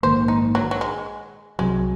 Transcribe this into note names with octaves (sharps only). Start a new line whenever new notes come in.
A#1 G#2 D#3 A#3 C5
D#4
F#3
F#3
G#3
C2 C3 F#3 G#3